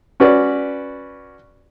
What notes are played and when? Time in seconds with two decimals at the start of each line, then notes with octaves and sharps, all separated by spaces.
0.20 C#4 F#4 B4 D5